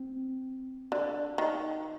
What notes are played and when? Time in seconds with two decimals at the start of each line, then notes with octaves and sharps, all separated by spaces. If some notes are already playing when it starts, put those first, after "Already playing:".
Already playing: C4
0.92 D3
1.38 D#3